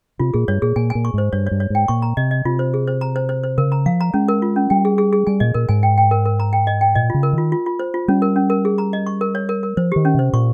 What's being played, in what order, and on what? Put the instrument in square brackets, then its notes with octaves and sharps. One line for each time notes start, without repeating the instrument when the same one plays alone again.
[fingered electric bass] C3 [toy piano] F4
[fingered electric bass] A#2 [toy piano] G#4
[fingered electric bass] G2 [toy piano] C#5
[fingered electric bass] A#2 [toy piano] G#4
[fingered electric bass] A#2 [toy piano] G#5
[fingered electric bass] A#2 [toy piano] G#5
[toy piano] C#6
[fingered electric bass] G#2 [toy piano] C5
[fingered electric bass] G2 [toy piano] C#5
[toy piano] C#5
[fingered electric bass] G2
[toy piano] C#5
[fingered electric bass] G#2 [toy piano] G5
[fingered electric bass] A#2 [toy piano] C#6
[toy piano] A#5
[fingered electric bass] C3 [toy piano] D#5
[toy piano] D#5
[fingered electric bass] C3 [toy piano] F4
[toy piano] C5
G#4
C5
A#5
C5
C5
C5
[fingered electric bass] C#3 [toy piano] A#4
[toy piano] A#5
[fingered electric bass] F3 [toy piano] F5
[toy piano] A#5
[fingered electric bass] G#3 [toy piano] C#4
[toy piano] A#4
F4
C#4
[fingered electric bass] G3 [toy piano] G5
[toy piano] G#4
G#4
G#4
[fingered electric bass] G3 [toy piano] G#5
[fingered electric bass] A#2 [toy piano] D#5
[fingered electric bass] A#2 [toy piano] A#4
[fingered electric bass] G#2 [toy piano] G#5
[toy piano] G5
G5
A#4
A#4
A#5
G5
D#5
G5
[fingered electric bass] A#2 [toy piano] D#5
[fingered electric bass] C#3 [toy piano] F4
[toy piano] A#4
[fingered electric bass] D#3 [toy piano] F4
[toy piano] F4
F4
C5
F4
[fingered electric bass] G3 [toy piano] C#4
[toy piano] A#4
C#4
A#4
G#4
A#5
D#5
C#6
A#4
C#5
A#4
A#4
[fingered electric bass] F3 [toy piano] C5
[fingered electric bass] D#3 [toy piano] G4
[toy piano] C#4
[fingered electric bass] C3 [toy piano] C5
[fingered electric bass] A#2 [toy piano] C#6